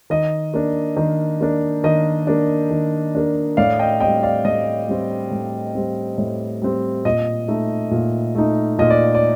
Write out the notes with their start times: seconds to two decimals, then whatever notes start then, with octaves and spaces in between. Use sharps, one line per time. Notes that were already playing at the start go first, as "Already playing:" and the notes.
0.10 D#3 D#5
0.54 A#3 D4
0.97 D#3
1.41 A#3 D4
1.84 D#3 D#5
2.27 A#3 D4
2.71 D#3
3.15 A#3 D4
3.57 A2 D5 F5
3.79 D#5 G5
4.00 G3 C4 D#5 G5
4.23 D5 F5
4.45 A2 D#5
4.88 G3 C4
5.31 A2
5.75 G3 C4
6.18 A2
6.62 G3 C4
7.05 A#2 D#5
7.48 A3 D#4
7.91 A#2
8.35 A3 D#4
8.78 A#2 D#5
8.90 D5
9.15 D5